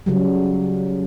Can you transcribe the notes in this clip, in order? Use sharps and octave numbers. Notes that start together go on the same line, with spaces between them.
C#3 F#3 G3